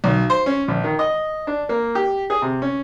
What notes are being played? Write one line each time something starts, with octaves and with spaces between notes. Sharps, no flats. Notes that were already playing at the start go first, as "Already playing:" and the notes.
B1
C5
C#4
A#1
D#3
D#5
D4
A#3
G4
G#4
C3
C#4